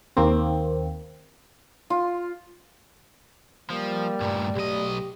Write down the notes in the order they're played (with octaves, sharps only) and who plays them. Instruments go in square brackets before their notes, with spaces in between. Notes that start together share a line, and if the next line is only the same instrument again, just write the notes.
[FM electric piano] D#2 A#3 C4
[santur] F4
[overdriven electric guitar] F3 [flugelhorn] G3 [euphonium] A#3
[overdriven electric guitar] G2 A#2 [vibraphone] A3 D5
[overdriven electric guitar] B1 D#5 [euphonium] G4